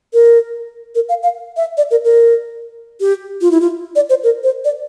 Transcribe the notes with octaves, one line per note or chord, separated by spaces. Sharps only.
A#4
A#4
F5
F5
E5
D5
A#4
A#4
G4
F4
E4
F4
D5
C5
A#4
C5
D5